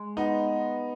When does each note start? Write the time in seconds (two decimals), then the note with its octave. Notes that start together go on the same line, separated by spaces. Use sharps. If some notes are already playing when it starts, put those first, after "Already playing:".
Already playing: G#3
0.17 B3 D#4